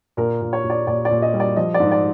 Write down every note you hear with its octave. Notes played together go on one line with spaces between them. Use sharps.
A#2 A#4
A#2
C#5
A#2
D5
A#2 D5
D5
A#2
D#5
G3
D5
F3 D#5
D5
G#2
D5